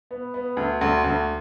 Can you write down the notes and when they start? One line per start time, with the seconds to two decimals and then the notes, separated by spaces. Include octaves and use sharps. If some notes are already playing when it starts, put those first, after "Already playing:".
0.11 B3
0.34 B3
0.57 D2
0.81 D2
1.04 D2